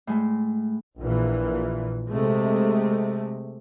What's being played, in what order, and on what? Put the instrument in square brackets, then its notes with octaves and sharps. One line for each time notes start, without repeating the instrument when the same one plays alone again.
[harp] A2 G#3 A3
[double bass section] A#1 A#2 E3
C3 G#3 A3